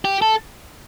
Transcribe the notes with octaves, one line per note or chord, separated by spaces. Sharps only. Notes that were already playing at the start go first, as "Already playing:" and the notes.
G4
A4